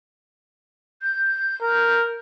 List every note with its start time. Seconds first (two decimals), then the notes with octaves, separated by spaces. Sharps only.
1.02 G6
1.62 A#4